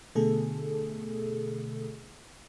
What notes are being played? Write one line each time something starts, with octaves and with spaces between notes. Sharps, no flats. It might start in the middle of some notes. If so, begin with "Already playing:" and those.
B2 D3 A3 G#4 A4